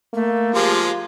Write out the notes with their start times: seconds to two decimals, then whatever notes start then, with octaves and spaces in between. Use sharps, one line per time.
0.14 A3 A#3
0.55 F3 G#3 F4 G4